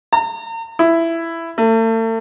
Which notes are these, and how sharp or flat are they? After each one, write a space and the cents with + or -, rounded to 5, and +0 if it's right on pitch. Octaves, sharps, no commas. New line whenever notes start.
A#5 -40
E4 +10
A3 +40